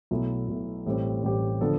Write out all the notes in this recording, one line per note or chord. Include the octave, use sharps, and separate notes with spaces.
B1 B2 A3 E4
B1 B2 A3 E4
A1 A2 G3 C4 G4
A1 A2 G3 C4 G4
D3 F3 B3 D4 A4